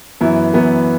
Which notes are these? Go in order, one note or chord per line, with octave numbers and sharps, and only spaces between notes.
F#2 E3 B3 E4
F#2 E3 B3 E4